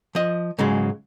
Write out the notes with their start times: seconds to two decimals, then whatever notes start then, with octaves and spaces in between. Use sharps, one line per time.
0.15 F3 D#5
0.59 G#2 C#3 F#3 G#3